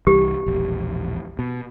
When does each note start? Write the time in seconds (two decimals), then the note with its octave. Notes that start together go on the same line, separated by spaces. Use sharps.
0.07 C2 E3 G3 G4
0.46 E1 A#1
1.39 B2